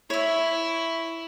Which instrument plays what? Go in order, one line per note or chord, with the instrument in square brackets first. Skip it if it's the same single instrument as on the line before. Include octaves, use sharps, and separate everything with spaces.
[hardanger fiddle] E4 [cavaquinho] C#5 E5